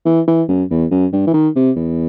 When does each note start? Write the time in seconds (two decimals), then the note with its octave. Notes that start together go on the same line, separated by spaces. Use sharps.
0.06 E3
0.27 E3
0.48 F#2
0.70 E2
0.91 F#2
1.13 G2
1.27 E3
1.34 D#3
1.56 C3
1.76 E2